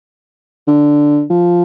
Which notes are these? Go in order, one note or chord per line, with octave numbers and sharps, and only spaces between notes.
D3
F3